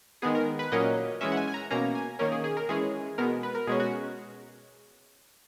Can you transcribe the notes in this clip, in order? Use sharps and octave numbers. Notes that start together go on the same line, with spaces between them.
D#3 G#3 B3 G#4
A#4
B4
A#2 F#3 A#3 C#4 D#5
E3 G#3 C#4 E5
F#5
G#5
G#5
A#5
B2 A#3 C#4 A#5
G#5
D#3 A#3 C#4 A#4
G#4
G#4
A#4
E3 G#3 C#4 G#4
B2 G#3 B3 A#4
B4
A#4
B2 G#3 C#4 G#4
F#4